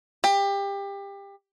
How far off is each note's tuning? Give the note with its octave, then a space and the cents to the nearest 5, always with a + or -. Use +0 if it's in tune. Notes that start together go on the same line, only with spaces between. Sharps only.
G4 +25